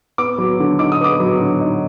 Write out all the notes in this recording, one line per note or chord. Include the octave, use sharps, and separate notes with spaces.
B3 D6
F#3
D3
D#4 D6
D#6
B3 D6
F#3
D3
D#4